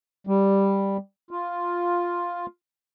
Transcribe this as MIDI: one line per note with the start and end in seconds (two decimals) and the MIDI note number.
0.27 0.97 55
1.31 2.46 65